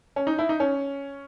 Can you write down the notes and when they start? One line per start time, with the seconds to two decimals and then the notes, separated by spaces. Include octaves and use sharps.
0.16 C#4
0.27 D#4
0.39 E4
0.49 D#4
0.60 C#4